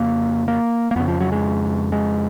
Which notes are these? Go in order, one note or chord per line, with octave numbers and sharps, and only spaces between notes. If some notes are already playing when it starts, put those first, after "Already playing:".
Already playing: F2 C#3 A#3
A#3
A#3
F2 C#3 B3
F3
F#3
G#3
G#3